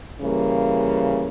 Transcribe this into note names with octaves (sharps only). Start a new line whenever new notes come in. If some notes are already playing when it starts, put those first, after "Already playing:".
C#3 E3 G3 A#3